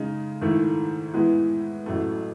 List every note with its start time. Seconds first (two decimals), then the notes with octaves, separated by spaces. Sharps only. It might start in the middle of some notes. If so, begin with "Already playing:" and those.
Already playing: C#3 G#3 D#4
0.42 G#2 D#3 A3 E4
1.13 A2 E3 G#3 B3
1.86 A1 A2 F#3 A3